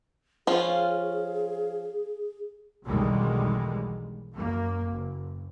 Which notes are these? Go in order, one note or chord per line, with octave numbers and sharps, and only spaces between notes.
F3 C#4 F4 G#4
B1 E2 D3 D#3 G3 G#3
F#2 A#3
F#1